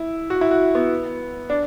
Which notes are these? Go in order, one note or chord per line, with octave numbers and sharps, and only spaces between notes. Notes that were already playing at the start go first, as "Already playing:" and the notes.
Already playing: E4
F#4
E4
F#4
B3
D4